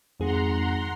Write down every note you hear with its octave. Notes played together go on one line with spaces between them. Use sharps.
G#1 F2 G#4 F#5 A#5 C6